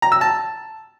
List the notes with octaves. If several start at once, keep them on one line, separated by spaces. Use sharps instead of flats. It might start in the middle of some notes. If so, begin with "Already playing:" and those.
A#5
E6
A5